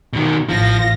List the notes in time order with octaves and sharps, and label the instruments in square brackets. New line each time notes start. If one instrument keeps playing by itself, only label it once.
[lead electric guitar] B2 D#3
[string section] A1 F5 A#6 [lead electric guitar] F3